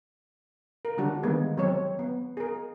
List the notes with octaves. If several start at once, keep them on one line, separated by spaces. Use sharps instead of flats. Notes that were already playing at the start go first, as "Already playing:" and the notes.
A#4
D3 G3 D4 F#4
D#3 G#3 A#3 B3
F#3 C4 C#5
B3
G#4 A#4